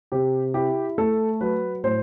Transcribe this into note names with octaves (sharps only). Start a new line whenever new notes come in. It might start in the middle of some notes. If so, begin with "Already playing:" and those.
C3 G4
E4 G4
A3 A4
F#3 B4
A2 C5